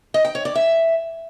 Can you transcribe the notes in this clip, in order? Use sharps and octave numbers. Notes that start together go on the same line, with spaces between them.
D#5
G5
C#5
D5
E5